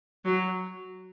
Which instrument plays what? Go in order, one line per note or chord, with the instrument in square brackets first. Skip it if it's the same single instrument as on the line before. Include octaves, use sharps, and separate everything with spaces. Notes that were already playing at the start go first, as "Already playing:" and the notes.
[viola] F#3